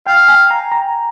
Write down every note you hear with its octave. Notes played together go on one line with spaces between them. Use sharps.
F5 G5
G#5
A#5
A#5